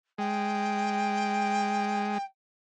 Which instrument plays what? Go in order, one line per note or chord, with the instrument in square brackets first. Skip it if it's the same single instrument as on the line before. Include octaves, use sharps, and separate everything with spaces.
[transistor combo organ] G#3 [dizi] G5